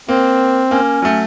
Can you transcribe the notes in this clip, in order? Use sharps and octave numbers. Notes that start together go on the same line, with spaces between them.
A#3 C4
A#3 C#4
F#3 A3